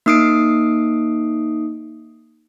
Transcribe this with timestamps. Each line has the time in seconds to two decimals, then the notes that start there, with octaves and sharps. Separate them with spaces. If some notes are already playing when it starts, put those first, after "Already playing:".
0.06 A#3 D#4 D#6 C7 D7